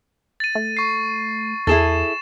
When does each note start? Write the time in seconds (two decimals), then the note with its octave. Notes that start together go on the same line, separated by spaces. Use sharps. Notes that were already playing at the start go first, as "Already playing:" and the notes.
0.40 A6 D#7
0.55 A3
0.77 C#6 C7
1.67 E2 E4 G#4 A4 A6 E7